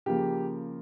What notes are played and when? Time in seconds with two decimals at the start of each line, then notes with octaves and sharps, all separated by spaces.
0.06 C#3 F3 A#3 G4